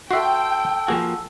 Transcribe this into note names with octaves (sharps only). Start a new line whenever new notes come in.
F#4 A4 E5 G5 C6
F3 A#3 F#4 G#4